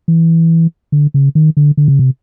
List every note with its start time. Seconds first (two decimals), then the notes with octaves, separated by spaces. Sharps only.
0.08 E3
0.92 D3
1.14 C#3
1.35 D#3
1.57 D3
1.77 D3
1.88 C#3
1.99 C3